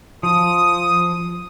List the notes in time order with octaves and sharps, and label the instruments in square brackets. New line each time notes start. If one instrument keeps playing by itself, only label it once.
[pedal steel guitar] F3 [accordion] D#6